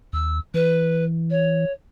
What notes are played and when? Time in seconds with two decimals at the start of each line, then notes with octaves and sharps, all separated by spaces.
0.13 D#2 E6
0.54 E3 B4
1.30 C#5